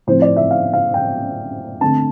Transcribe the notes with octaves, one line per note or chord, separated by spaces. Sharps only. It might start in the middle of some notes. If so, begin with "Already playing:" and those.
A2 F3 C4 C5
D5
E5
F5
F5
G5
D3 A3 C4 A5